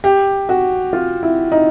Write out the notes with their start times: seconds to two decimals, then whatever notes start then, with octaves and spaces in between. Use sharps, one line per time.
0.04 G4
0.49 F#4
0.93 F4
1.23 E4
1.52 D#4